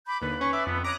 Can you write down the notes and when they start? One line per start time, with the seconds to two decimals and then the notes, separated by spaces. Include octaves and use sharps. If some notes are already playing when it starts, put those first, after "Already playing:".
0.06 B5 D6 G6
0.21 D#2 D3 B4
0.41 C#4 C#6
0.53 D5 E5
0.66 F2 B3
0.84 C#5 A#5 D6 D#6 F#6